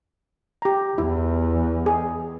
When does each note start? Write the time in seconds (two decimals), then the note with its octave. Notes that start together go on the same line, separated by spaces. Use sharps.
0.62 G4 A#5
0.98 E2 E4
1.86 G#4